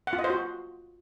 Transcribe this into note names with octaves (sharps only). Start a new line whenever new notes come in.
F#5
F4
D#5
C5
F#4